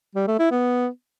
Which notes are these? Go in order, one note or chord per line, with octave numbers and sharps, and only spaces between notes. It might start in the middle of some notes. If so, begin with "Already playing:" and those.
G3
A3
E4
B3